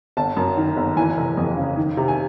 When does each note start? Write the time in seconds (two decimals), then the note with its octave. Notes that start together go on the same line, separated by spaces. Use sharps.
0.17 G1 A5
0.37 F#2
0.57 D#3
0.77 G1
0.97 E3 G#5
1.17 F1
1.37 F2
1.57 C#3
1.77 D#3
1.97 C3
2.08 G#5